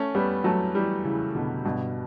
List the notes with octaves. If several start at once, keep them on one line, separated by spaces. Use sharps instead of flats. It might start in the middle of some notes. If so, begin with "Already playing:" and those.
Already playing: A3 C#4
G3 B3
F#3 A3
E3 G3
C#3 E3
B2 D3
G2 B2